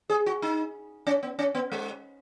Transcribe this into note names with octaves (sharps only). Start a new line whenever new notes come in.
G#4
F#4
D#4
C#4
B3
C#4
B3
G#3